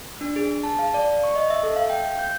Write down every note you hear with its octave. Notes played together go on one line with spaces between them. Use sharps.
D4
G#4
A5
F5
D5
C#6
D#5
E5
A4
F5
G5
G6